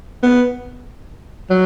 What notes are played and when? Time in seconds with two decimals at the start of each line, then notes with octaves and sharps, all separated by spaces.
0.23 B3
1.50 F#3